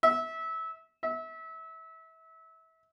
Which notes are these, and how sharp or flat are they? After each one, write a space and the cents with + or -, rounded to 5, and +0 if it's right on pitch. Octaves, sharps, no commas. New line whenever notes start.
E5 -20
E5 -25